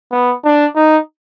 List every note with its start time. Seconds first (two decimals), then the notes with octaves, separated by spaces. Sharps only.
0.12 B3
0.44 D4
0.75 D#4